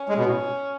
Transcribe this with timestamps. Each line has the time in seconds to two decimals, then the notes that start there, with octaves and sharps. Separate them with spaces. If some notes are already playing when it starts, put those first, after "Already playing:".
Already playing: C#4
0.09 G#3
0.17 B2
0.26 A2